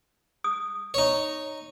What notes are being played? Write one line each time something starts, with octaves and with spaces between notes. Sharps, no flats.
D#6
D#4 C#5